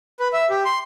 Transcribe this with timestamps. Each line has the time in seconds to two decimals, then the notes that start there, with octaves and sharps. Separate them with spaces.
0.20 B4
0.33 E5
0.50 G4
0.65 C6